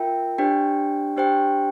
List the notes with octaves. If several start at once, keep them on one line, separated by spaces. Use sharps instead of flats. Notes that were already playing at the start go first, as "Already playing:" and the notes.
Already playing: F4 A#4 E5 G5
D4 G4 C5 G5
D4 G4 C5 G5